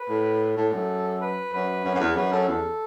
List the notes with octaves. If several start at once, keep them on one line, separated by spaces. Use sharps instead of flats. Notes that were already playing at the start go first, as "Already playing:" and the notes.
Already playing: B4
A2
A2 A4
F#2
B4
F#2 B4
F#2
F#2
E2
F#2 B4
F#2 A4
E2 A4